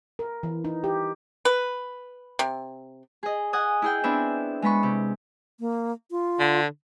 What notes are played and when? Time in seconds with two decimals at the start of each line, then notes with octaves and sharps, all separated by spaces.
0.19 A#4
0.43 E3
0.65 D#4
0.84 G4
1.45 B4
2.39 C3
3.23 G#4 D#5
3.53 D#5 F#5 G#5 D#6
3.82 E4 G#4 G5
4.04 B3 C4 D4 E4 E5
4.62 G#3 B3 B5 C#6
4.83 C3
5.60 A#3
6.11 F4
6.39 D3